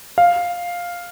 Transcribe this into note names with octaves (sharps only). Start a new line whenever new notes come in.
F5